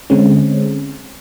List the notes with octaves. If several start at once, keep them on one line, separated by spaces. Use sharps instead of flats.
D3 G#3 C4 C#4